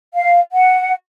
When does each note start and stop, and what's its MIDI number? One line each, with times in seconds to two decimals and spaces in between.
0.14 0.40 77
0.52 0.92 78